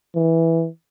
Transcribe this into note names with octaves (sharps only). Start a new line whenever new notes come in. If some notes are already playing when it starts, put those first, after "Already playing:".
E3